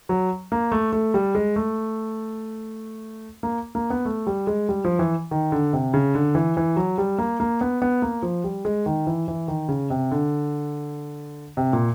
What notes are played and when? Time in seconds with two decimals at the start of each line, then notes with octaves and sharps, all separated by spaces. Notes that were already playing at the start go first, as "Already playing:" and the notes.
0.09 F#3
0.52 A#3
0.72 A3
0.93 A3
1.14 G3
1.35 G#3
1.56 A3
3.43 A#3
3.75 A#3
3.90 B3
4.05 A3
4.27 G3
4.47 G#3
4.69 G3
4.85 F3
4.99 E3
5.31 D#3
5.52 D3
5.73 C3
5.94 C#3
6.15 D3
6.35 E3
6.57 E3
6.76 F#3
6.98 G3
7.19 A#3
7.40 A#3
7.61 B3
7.82 B3
8.02 A#3
8.22 F3
8.44 G3
8.65 G#3
8.86 D#3
9.07 E3
9.28 E3
9.48 D#3
9.69 C#3
9.90 C3
10.11 D3
11.57 C3
11.73 A#2